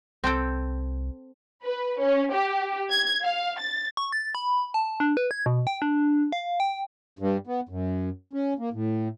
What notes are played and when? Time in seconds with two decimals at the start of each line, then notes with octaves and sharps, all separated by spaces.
0.24 C2 C4 A4 G5
1.63 B4
1.99 C#4
2.32 G4
2.90 G#6
3.23 F5
3.60 A6
3.97 C#6
4.12 A6
4.35 B5
4.74 A5
5.00 D4
5.17 B4
5.31 G#6
5.46 B2
5.67 G5
5.82 D4
6.32 F5
6.60 G5
7.19 G2
7.47 B3
7.69 F#2
8.33 C#4
8.59 A#3
8.73 A2